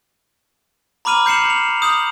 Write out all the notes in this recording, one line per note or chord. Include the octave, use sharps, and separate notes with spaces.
A#5 B5 D6 F6 D#7 F7
G6 C7 C#7 E7 F#7
F7
D#6 G6 F7 F#7